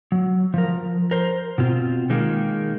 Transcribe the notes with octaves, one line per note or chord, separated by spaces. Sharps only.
F#3
F3 A#4
A#4 C5
B2 C4 F4
D#3 G#3 A#3